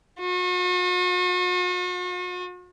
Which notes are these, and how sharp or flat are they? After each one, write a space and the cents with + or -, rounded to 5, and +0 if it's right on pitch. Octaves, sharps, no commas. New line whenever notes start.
F#4 -45